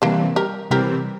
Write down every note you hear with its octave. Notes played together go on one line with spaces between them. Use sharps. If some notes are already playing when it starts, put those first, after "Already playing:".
C3 E3 G3 A#3 C4 D4
G4 A#4
C3 E3 G3 C4 G4 A#4